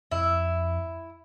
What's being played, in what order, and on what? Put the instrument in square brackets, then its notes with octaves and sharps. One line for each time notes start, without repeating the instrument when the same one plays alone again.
[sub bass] F2 [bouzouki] E4